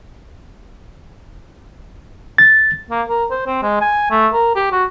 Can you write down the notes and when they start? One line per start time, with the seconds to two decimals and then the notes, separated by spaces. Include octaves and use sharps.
2.38 A6
2.91 A#3
3.09 A#4
3.31 C5
3.47 C4
3.63 G#3
3.81 G#5
4.11 A3
4.33 A#4
4.56 G4
4.72 F#4